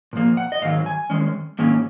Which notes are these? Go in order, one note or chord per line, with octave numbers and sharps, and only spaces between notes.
A#2 F3 A#3
F#5
D#5
G#2 D#3 F#3 F5
G#5
F#2 D#3 G#3 C#4
G#2 D#3 F#3 A#3 C#4 G#5